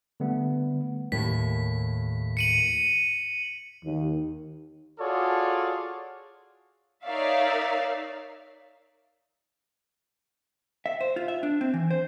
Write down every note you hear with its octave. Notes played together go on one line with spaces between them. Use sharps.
D3 G3 A3 B3
D#2 A2 B6
C#7 D#7 F#7
D#2
F4 F#4 G#4 A4 C#5 D5
D#4 A#4 C#5 D5 E5 F5
E5
C5
F4
E5
D4
C4
E3
C5